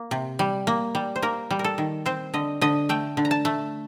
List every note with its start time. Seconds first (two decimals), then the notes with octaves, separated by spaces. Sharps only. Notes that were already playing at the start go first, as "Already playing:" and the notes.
Already playing: A#3
0.11 C3
0.39 G3
0.67 A#3
0.95 G3
1.16 C5
1.22 A#3 A#4
1.50 G3
1.59 A#4
1.64 A4
1.78 D#3
2.06 C4 C5
2.34 D3 D#5
2.61 D3 D#5
2.89 A3 G5
3.17 D3
3.25 A#5
3.31 A5
3.45 A3